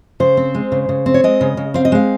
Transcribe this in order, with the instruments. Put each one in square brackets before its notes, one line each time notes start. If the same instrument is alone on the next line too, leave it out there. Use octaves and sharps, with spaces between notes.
[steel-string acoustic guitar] C#3 C5
C4
G#3
C#3
C#3
C4
C#5
G#3 D#5
C#3
C#3
C4 F5
D#5
G#3 F5